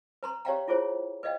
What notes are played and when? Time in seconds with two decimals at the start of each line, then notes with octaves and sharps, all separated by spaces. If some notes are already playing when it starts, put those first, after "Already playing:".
0.23 B4 A#5 C6
0.45 G4 C#5 D5 F5 G5 A#5
0.68 E4 F4 G#4 C5 C#5
1.23 B4 D5 D#5 F5 G5